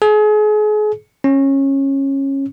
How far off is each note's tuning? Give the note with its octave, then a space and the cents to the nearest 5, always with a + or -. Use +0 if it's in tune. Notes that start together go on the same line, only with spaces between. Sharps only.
G#4 +35
C#4 -20